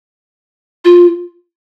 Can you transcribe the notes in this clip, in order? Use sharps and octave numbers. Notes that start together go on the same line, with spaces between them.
F4